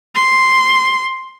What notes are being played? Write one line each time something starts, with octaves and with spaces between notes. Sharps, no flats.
C6